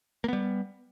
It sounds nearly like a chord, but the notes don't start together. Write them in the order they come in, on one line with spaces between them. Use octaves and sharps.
A#3 B3 G3